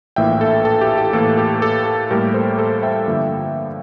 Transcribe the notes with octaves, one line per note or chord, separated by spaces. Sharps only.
A#1 A2 E3 A#3 E5 G5
A4
A4
G4
G4
A2 E3 A#3 A4
G4
A4
A4
A2 G3 A#3 G4 A#4
A4 C5
A4 C5
E5 G5
G2 D3 F3 A#3